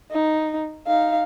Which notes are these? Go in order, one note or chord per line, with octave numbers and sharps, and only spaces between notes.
D#4
D#4 F5